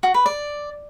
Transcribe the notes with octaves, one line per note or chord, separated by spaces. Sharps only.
F#4
B4
D5